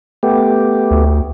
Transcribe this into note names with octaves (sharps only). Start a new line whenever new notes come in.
A3 B3 G4
D2